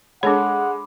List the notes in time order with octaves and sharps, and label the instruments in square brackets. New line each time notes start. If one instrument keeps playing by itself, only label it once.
[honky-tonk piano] G#3 [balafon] D4 A4 C#5 [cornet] F#5 [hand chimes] B5 D6